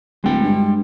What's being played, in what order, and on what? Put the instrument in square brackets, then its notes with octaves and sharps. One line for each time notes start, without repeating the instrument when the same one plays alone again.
[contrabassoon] D1 [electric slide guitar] G#3 G5
[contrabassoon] G2